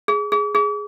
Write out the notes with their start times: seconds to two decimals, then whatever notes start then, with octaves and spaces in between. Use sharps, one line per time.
0.08 G#4
0.32 G#4
0.55 G#4